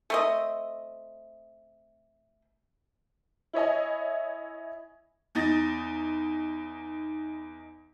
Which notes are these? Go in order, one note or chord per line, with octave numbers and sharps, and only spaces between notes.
A3 C4 D#5
E4 C#5 D#5 G#5
E2 D#4 A6 A#6